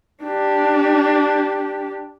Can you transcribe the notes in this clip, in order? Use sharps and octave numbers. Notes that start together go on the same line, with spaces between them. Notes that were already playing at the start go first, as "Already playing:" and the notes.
D4 G4